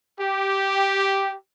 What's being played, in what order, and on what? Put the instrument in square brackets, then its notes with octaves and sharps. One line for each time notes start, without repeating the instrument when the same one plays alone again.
[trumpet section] G4